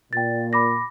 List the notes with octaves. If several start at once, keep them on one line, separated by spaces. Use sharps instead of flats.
A#2 G5 A6
B5 D6 A#6